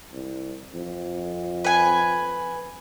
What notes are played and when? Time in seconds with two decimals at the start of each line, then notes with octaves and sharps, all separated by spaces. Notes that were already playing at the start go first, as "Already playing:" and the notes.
0.12 C2
0.74 F2
1.64 B4 G#5